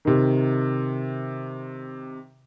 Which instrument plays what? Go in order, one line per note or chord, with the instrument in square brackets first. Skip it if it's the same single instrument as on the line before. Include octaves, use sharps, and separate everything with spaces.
[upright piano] C3 D#3